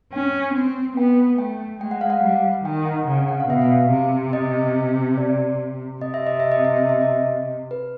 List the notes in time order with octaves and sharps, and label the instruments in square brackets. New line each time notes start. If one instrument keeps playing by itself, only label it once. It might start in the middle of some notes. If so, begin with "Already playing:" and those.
[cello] C#4 [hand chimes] G5
[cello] C4
[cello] B3 [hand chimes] G5
[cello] A3 [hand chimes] G5
[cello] G#3 [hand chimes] G5
[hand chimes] F#5
F5
F#5
[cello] G3
[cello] D#3 [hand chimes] G5
[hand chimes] F#5
[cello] C#3
[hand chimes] F#5
F5
[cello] B2 [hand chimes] E5
[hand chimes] F5
[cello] C3
[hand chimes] D#5
D5
[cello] C3 [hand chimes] D#5
[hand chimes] E5
D#5
E5
D#5
E5
D#5
E5
D#5
B4